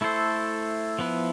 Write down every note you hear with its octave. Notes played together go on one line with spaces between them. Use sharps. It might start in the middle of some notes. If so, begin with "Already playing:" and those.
A3 E4 A4 C5
F3 B3 E4